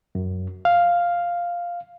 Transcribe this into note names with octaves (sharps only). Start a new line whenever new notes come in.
F#2
F5